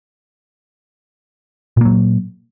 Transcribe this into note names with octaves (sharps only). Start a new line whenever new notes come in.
A#2 F#3 A#3